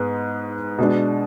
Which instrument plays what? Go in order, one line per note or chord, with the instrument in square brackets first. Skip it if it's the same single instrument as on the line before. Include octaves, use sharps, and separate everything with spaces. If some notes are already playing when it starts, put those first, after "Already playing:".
Already playing: [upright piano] G#2 G#3 B3
B2 G#3 D4